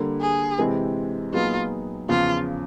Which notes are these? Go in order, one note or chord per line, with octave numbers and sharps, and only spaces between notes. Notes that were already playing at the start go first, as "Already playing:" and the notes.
Already playing: D3 G3 A#3
G#4
C3 E3 G#3 C4
A#2 F#3 B3 D#4 F4 G#4
E2 C#3 F3 F4